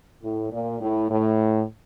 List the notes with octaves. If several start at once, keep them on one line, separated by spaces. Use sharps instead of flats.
A2
A#2
A2
A2